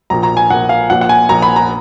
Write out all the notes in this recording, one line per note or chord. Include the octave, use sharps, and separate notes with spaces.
A#1 A#2 A#5
A#5
G#5
A#1 A#2 F#5
F5
A#1 A#2 F#5
F#5
G#5
A#1 A#2 A#5
B5
A#5